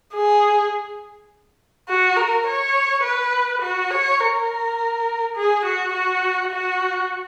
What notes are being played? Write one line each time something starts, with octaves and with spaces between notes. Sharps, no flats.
G#4
F#4
A#4
C#5
B4
F#4
C#5
A#4
G#4
F#4
F#4
F#4